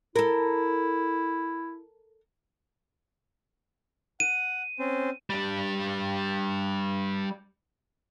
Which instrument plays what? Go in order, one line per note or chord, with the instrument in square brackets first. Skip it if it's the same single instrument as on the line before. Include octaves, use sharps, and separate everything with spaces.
[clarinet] E4 [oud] A4 A#4
[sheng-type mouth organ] F#5 [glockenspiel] D#7
[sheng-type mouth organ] C4 C#4 C5
[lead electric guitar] G3 D4